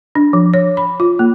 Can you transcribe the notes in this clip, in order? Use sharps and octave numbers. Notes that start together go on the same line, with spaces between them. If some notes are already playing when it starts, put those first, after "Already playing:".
D4
F3
C#5
B5
F4
A#3